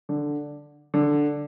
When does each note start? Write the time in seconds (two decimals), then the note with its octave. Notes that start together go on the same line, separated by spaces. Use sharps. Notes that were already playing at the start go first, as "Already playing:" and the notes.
0.09 D3
0.94 D3